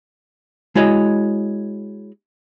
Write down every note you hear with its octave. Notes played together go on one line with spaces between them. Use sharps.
G#3 E4 F#4 C#5 D#5